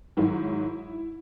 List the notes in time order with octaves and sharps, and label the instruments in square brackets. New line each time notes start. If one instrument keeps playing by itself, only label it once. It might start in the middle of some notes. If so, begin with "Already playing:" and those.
[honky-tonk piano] G#2 D#3 F#3 E4